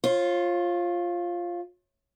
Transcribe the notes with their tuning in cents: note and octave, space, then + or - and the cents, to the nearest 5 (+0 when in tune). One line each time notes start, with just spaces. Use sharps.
F4 +0 C#5 -40